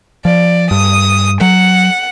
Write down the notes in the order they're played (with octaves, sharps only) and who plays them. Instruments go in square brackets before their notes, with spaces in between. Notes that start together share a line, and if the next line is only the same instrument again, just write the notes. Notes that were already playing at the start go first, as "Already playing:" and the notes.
[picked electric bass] F3 [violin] D5
[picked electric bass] G2 [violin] D#6
[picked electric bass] F#3 [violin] F#5